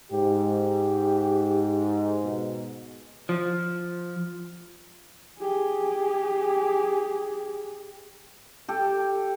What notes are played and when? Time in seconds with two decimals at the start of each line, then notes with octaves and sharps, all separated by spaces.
0.12 G#2 G4
2.24 B2
3.29 F3
5.39 G4 G#4
8.69 G4 A4